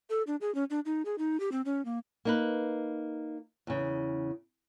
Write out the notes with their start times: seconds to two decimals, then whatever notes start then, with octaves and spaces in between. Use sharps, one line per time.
0.10 A4
0.27 D4
0.41 G#4
0.55 C#4
0.70 D4
0.85 D#4
1.05 G#4
1.18 D#4
1.40 G4
1.52 C4
1.65 C#4
1.85 A#3
2.25 A#3 D#4 B4
3.67 E2 C#3